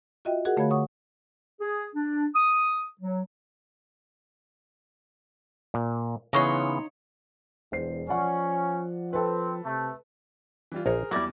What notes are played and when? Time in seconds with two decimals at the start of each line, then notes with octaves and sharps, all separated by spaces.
0.25 F4 F#4 D#5 E5 G5
0.45 F#4 G#4 A#4 F#5
0.57 D3 A3 C#5 F5 B5 G#6
0.70 C#5 F#5 C#6 D#6
1.60 G#4
1.94 D4
2.34 D#6
3.00 F#3
5.74 A#2
6.33 C#3 E3 B3 D#4 C#5 C6
7.72 E1 E2 C5 C7
8.09 F3 C#4 D5 F#5
9.13 C4 A4 B4
9.65 C3 A3
10.72 E3 G3 F4
10.86 A#1 G#4 A#4 C5 C#5
11.11 E2 F#3 G3 E4 D5 A#6